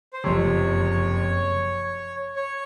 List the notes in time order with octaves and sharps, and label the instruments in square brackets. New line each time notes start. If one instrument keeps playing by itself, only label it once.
[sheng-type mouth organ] C5
[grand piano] F#1 F2 C3 [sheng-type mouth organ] C#5
[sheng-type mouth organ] C#5